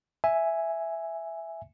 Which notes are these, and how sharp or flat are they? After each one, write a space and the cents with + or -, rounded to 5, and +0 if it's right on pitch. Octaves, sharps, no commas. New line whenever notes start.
E5 +0 G#5 +0